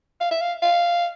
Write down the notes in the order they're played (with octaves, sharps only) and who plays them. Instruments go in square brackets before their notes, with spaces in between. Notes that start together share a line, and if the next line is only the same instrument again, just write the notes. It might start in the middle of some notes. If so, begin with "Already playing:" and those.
[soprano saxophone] F5
E5
F5
F5